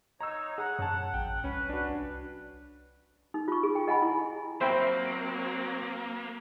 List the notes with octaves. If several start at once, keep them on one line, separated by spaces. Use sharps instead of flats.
D#4 C#5 A#5 E6
G#4 F#5 A#5
F#2 C#5 A5
A1 G5
C2 C#4 B4
D4 F#4
D#4
F4 C#6
G#4
G5
D#5 F#5 G#5 B5
E4
F#3 A#3 C4 C5 E5 G5 B5